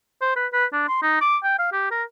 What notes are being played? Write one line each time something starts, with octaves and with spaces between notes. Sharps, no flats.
C5
B4
B4
D4
C6
D#4
D6
G5
F5
G4
A#4